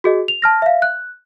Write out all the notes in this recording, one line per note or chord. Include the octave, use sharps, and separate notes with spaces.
F#4 G#4 D#5
F7
A5 F6 A#6
E5 F5
F#6